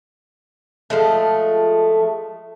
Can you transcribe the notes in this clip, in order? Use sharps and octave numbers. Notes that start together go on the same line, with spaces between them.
F3 G#3 A3